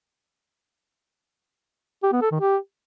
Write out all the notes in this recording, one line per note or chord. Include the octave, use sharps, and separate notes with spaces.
G4
B3
A4
D#3
G4